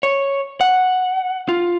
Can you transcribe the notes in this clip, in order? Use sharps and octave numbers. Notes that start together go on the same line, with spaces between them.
C#5
F#5
F4